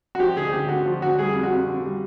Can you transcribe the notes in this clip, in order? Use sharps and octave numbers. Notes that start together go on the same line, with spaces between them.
F#4
F3 G4
D2 G#4
D2 G4
D3 F#4
F3
D2 F#4
G3 G#4
F2
F#4
F2
D3
G3